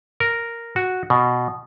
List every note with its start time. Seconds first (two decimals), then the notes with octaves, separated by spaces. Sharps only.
0.20 A#4
0.76 F#4
1.10 B2